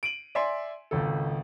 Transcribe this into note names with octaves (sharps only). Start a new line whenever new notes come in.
D7 D#7 F#7
D5 E5 G#5 C6
G#1 C#2 A4